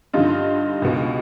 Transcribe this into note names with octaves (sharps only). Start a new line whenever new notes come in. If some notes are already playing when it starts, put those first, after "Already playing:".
G2 D3 D#4 F4
C#2 B2